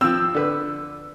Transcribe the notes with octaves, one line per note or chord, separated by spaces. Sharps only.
F3 C4 E6
D3 B4